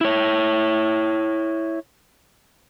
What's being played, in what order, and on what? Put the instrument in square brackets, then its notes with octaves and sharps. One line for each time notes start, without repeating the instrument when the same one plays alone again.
[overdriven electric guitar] E4 C#5